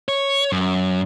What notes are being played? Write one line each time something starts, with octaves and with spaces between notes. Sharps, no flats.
C#5
F#2